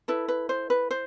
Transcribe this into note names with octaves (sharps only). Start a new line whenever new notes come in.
E4 A4 B4
B4
C5
B4
C5